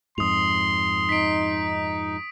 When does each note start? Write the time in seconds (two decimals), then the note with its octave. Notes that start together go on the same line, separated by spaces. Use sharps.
0.18 F2 G#2 C6 D#6 F7
1.09 D#4 B6 D7